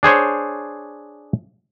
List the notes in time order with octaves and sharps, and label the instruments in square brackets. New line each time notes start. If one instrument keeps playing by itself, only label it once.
[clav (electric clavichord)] D4 G#4 C5 C#5